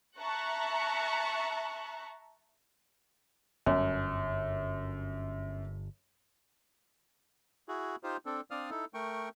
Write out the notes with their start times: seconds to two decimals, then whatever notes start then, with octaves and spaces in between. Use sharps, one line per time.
0.18 E5 A5 A#5 C#6 F#6
3.66 G1 F#2
7.68 E4 F#4 G#4
8.03 D#4 F4 G4 C5
8.26 C4 D4 A4
8.51 C4 D4 D5 F5 D#6 F6
8.70 D#4 E4 A4
8.94 A3 A#4 G5 C#6